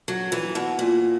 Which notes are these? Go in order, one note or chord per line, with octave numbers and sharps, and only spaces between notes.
F#3
E3
B2
A#2